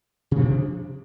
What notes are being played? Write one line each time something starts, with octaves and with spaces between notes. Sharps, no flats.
C3 F3 D4